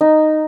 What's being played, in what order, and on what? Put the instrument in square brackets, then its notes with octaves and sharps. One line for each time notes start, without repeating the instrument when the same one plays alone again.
[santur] D#4